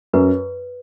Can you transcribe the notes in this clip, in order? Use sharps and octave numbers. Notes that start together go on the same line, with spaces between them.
F#2 B4